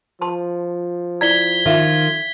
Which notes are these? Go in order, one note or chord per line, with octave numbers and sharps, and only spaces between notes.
F3 A5 B5 C6
E4 D5 A#5 G#6 B6 G7
D#3 F4 E5 F5